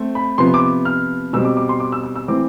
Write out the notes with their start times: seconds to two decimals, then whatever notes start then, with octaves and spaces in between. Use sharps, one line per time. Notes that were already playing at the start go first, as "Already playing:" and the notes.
Already playing: A3 C4
0.15 B5
0.38 C3 F3 B3 C6
0.54 D6
0.85 F6
1.33 B2 G3 C4 E6
1.45 D6
1.57 D6
1.69 C6
1.80 D6
1.92 E6
2.04 E6
2.16 E6
2.28 E3 A3 C4 D6